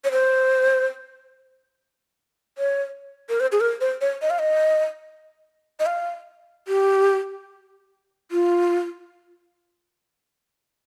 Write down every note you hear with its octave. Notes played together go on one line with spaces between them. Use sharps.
C#5
C5
C#5
A#4
C5
G#4
A#4
C5
C#5
D#5
F5
D#5
D#5
F5
G4
F4